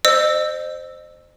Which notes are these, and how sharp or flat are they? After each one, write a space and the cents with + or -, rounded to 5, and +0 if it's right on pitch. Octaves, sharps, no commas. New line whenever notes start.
C5 +0 D#5 -35 E6 +0